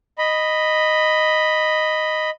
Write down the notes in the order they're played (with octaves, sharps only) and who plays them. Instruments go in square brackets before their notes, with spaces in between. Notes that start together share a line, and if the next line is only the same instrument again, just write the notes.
[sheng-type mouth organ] D#5 B5